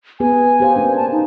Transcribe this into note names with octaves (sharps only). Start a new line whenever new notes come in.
B3 G#4 B4 G#5
G4 C5 F5
A#3 C#4 D4 G#5
A5
D#4